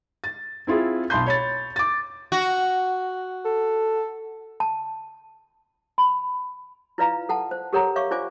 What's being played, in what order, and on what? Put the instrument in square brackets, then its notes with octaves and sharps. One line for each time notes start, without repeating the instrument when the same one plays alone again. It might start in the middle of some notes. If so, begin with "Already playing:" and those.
[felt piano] A6
C4 E4 F4 G#4
B1 A5 B5 C6 G6
C#5 B5 A6
D6 A6
[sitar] F#4
[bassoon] A4
[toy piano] A5
B5
E4 F4 B4 D5 F5 A#5
A4 F#5 A5
C5
G4 A4 A#4 C#5 F#5 A#5
C#5 E5 F5 C#6 D6
F4 C5 D5 G#5 D6